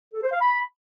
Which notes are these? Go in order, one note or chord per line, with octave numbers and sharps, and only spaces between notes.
A4
C5
F5
B5